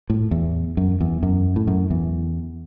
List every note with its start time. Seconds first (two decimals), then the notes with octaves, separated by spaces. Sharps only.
0.10 A2
0.31 E2
0.77 F#2
1.01 E2
1.23 F#2
1.56 A2
1.67 F#2
1.90 E2